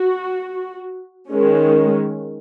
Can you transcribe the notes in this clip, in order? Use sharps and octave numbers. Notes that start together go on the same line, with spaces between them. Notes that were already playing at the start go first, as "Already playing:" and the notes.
Already playing: F#4
D#3 G#3 C#4